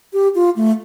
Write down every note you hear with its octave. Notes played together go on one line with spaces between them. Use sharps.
G4
F4
A3